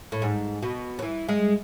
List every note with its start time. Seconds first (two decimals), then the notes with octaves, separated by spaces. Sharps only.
0.12 A2
0.22 G#2
0.62 B2
0.99 F#3
1.02 E3
1.29 G#3